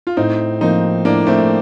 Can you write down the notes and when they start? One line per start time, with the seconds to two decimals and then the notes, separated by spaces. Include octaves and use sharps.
0.07 F4
0.17 A2 C4 D#4
0.61 F3 A#3 C4 D#4
1.05 A2 A#3 D4
1.27 A3 C4